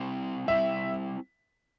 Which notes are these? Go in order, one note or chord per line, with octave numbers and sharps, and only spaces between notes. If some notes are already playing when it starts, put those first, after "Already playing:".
Already playing: G3 C4 E4
G3 C4 E4 E5